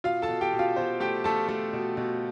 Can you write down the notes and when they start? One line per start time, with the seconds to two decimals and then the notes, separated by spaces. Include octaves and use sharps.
0.04 B2 F4 F5
0.22 A4 A5
0.29 B2
0.41 G4 G5
0.53 B2
0.59 F4 F5
0.76 B2 C5
1.00 A3 G4 G5
1.24 A3 A4 A5
1.49 A3
1.73 B2
1.97 B2